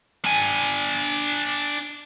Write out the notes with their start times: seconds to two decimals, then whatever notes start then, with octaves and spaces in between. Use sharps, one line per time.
0.25 D4 G#5